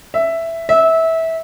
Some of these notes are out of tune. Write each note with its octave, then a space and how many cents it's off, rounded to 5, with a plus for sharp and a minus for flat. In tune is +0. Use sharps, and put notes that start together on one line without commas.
E5 +5
E5 -20